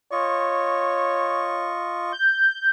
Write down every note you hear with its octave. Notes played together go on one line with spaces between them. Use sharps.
F4 C#5 D#5 C#6
G6